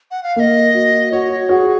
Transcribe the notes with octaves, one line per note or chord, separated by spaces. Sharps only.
F#5
F5
A#3 D#5 F5
F#4
F#4 C#5
F#4 G#4